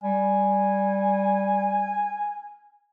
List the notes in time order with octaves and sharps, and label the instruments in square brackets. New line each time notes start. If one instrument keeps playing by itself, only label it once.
[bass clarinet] G3 [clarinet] G#5